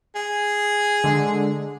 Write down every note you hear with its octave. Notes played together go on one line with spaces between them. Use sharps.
G#4
D3 G#3